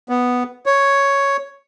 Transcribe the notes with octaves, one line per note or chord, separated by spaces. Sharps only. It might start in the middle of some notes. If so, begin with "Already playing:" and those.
B3
C#5